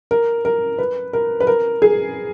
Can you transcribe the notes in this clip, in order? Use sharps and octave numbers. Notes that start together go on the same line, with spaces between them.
A#4
A#4
B4
A#4
B4
A#4
G#4